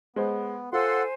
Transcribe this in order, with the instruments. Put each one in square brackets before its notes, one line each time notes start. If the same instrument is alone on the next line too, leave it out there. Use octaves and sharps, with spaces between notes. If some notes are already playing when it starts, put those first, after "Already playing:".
[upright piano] G#3 C5 [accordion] B3
[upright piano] F4 [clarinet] A4 [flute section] C5 G#5 [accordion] F#5 C6